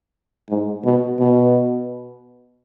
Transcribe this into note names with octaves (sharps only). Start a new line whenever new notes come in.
G#2
B2
B2